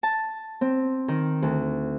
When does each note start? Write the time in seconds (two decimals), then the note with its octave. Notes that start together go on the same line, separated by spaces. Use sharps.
0.03 A5
0.61 C4
1.08 D#3
1.42 D2